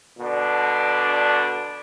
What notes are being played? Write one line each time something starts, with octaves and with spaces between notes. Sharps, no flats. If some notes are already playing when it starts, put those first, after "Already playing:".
B2 D3 D4